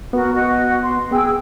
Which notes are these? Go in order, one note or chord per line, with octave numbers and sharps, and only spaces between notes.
B3 F#4 A#4
F#4 D#5 F#5
C6
B3 G#4 G5 E6